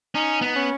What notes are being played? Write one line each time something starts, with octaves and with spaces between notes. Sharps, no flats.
C#4 D#4
B3 D#4
C#4